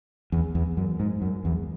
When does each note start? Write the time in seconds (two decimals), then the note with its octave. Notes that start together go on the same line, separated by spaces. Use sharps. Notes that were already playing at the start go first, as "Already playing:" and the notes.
0.32 E2
0.55 E2
0.77 F#2
1.00 G#2
1.22 F#2
1.45 E2